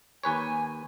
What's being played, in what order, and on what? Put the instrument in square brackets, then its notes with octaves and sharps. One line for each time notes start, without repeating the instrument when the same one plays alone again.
[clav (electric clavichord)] D#2 B4 C#5 [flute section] G#5